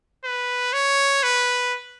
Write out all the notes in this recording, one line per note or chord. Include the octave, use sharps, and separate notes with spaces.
B4
C#5
B4